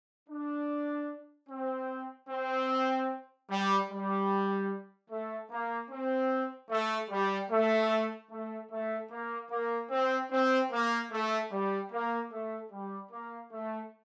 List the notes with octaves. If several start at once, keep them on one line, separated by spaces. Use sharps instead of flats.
D4
C4
C4
G3
G3
A3
A#3
C4
A3
G3
A3
A3
A3
A#3
A#3
C4
C4
A#3
A3
G3
A#3
A3
G3
A#3
A3